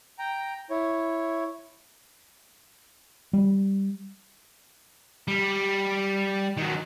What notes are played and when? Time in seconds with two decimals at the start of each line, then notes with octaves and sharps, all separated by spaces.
0.19 G5 A#5
0.70 E4 C#5
3.33 G3
5.28 G3
6.57 D#3 F#3